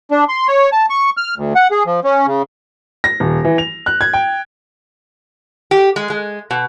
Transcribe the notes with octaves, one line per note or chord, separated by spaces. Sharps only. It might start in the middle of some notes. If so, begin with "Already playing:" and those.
D4
C6
C#5
A5
C#6
F6
D2
F#5
G#4
F3
C#4
C#3
A#6
D#1
E3
F7
F#6
G#6
G5
G4
G#3
G#3
B2